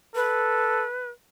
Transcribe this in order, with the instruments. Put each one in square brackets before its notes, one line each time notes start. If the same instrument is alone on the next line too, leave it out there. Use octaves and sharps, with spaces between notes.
[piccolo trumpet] A4 [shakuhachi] B4